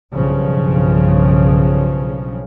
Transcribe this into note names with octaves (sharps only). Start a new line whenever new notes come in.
B1 G2 C#3 F3